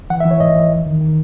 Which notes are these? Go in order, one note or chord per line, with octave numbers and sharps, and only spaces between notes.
E3 F#5
E5
E3
C#5
G#2 D#5
E3
E2
D#3
D#3